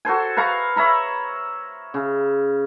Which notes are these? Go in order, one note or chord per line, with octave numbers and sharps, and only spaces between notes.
F#4 A4 C5 G#5
B4 F5 A#5 C#6
C#5 E5 A#5 B5
C#3